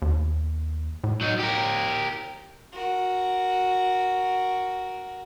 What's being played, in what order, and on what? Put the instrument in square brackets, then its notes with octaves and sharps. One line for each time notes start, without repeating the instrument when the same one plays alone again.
[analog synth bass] D#2
A2
[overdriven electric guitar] F#3 D#4
G4 A#4
[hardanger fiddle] F#4 A#4